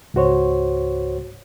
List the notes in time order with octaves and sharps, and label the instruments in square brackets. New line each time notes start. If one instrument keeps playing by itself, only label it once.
[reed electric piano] C#2 G#2 F#4 C5 C#5